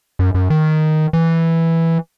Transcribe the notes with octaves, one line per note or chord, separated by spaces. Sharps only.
F#2
F#2
D#3
E3